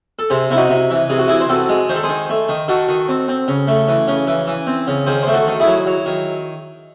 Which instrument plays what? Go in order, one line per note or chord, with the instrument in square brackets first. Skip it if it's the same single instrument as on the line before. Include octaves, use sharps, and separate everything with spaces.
[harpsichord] A4
C3 G#4 C5
C3 E4
D#4 F#4
C3
E3
C3 G#4
F#4
E3 E4 G#4
C5
C4 F#4 A4
G#3
D#3 C5
A4
G#4 C5
D#3
A3
D#3
D#3 F#4 A4
D#3
C4
C4
C#3
A3
E3
C#3
E3
E3
C4
C#3
D#3 G#4 C5
A3 C5
F#4 A4
D#3
E4 G#4
F#3
F#3
D#3